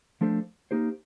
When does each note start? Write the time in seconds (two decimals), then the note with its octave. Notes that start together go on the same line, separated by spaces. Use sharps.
0.21 F3 A3 D4 A4 C5
0.71 A#3 D#4 G4 C5